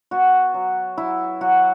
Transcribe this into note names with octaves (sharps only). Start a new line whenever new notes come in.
B3 F#4
F#3
F#3 E4
F#3 F#4